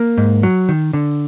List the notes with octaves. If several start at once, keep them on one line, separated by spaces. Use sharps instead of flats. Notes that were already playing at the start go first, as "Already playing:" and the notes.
Already playing: A#3
G#2
F#3
D#3
D3